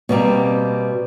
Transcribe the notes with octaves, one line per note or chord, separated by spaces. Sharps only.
B2 G3 A#3 C4